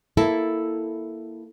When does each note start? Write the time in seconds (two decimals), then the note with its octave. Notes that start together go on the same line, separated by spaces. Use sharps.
0.17 A#3 E4 A4